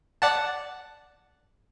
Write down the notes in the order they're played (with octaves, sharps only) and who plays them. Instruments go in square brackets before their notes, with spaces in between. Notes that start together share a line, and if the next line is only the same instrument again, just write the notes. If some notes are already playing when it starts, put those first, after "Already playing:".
[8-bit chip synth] D5 F#5 A5